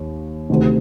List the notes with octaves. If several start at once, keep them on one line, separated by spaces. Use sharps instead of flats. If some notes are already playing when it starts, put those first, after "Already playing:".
Already playing: D#2
D2 C3 D#3